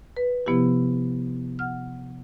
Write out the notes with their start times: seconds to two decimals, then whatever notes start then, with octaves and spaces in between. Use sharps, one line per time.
0.16 B4
0.46 C3 F3 B3 E4 G4
1.59 F#5 F6